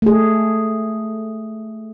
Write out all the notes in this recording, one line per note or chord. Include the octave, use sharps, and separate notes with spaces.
A3 G#4